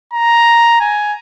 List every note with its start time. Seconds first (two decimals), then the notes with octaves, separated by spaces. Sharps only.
0.13 A#5
0.81 G#5